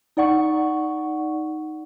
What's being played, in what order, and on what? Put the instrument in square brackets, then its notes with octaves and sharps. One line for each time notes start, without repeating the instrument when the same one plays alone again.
[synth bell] D#4 D5 F#5 C#6